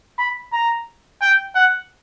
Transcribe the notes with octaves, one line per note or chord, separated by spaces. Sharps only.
B5
A#5
G5
F#5